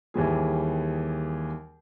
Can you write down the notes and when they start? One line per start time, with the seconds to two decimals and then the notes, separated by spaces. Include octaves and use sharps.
0.14 D#2 E3 G3 G#4